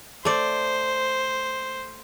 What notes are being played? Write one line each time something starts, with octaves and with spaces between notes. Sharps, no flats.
A3 C5 D5